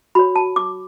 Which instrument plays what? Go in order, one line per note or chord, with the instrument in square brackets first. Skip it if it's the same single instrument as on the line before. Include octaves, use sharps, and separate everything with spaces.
[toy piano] F#4 C#5 B5
A5
D6